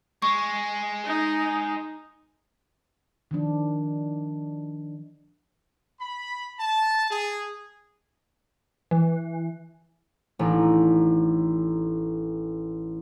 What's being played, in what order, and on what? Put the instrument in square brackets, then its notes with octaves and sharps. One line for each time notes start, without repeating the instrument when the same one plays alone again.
[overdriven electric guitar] G#3 [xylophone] C#6
[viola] D#4
[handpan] D#3 F3 D4
[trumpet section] B5
A5
G#4
[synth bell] E3
[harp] A1 D4 D#4